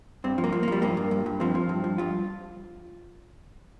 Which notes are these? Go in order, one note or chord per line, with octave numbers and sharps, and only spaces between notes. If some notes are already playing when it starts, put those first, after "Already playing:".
G2 C4
F3
A#3
F3
A#3
F3 G3
G2 A#3
G2
G2
G2
F3 C4
F3
G2
F3
G2 F4